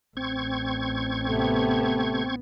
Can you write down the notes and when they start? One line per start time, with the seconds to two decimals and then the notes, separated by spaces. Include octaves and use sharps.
0.17 A1 C4 C#6 G#6
1.27 C3 A3 B3